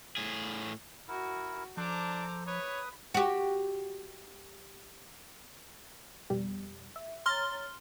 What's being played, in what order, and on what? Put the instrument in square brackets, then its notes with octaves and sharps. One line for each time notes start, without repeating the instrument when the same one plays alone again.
[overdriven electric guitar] A2 G#4
[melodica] E4 A#4 [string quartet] F#4
[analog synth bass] F3 [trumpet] D4 [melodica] A4 C5 [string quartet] A#5 D6
[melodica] B4 D#6 [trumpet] C#5 [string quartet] B5
[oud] F#4 G4
[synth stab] F2 B2 G3
E5
[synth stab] C#5 A#5 A6 [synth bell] C6 F6 G7